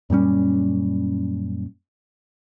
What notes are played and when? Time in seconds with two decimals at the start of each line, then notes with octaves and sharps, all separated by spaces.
0.10 F#2 A#2 G3 C#4